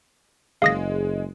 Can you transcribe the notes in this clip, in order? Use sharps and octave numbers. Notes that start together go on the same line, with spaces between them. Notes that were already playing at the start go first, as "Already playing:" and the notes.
F#1 G#3 F5 D#6 A#6